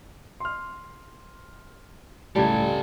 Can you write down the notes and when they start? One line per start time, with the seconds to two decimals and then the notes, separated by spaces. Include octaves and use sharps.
0.40 C6 F6
2.36 C#2 A2 G3 G4 A4 A5 G#6